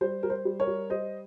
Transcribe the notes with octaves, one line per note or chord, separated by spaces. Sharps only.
G3 C5
G3 A#4
C5
G3
A#4 C#5
G3
G3 C5 D#5